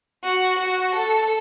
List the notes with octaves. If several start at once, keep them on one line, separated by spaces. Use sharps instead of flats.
F#4
F#4
A4